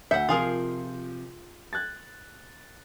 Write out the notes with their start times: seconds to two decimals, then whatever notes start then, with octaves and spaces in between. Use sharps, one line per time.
0.11 D2 E5 F#5 G6 C#7
0.29 C3 F3 F4 G#4 A#4
1.73 F#6 G#6 A6